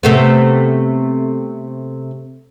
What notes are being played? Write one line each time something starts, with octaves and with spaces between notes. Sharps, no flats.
C3 A3 B3